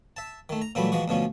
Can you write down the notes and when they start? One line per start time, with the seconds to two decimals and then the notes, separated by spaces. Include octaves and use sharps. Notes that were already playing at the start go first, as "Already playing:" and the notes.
0.17 E5 A5
0.49 D#3 A3
0.62 A#5
0.75 A#2 E3 F#3 G3 A3 B5
0.92 E3 F3 G#3 F#4
1.08 D2 B2 F3 C#4